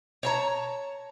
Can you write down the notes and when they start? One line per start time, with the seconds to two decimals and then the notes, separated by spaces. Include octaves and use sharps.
0.23 C#5 A5 A#5